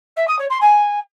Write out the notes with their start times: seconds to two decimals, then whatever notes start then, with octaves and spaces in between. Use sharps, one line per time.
0.16 E5
0.27 D#6
0.38 C#5
0.49 C6
0.61 G#5